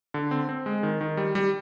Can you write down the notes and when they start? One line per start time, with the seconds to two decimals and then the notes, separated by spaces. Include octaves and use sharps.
0.14 D3
0.31 C4
0.49 C4
0.66 G#3
0.83 D#3
1.01 D#3
1.17 G3
1.35 G3